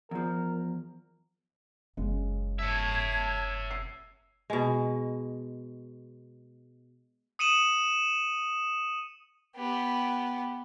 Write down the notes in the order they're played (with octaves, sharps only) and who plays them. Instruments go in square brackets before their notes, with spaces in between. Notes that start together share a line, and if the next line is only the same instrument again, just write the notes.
[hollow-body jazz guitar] E2 F3 [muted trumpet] A#4
[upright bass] F#1 [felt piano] C#3 G#3
[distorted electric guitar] C#5 E5 [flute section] A5 G#6
[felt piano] C7
[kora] B2 G#3
[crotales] D#6 C#7 D#7 E7 F#7
[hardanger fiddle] B3 G4